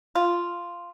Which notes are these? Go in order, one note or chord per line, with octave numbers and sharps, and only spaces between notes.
F4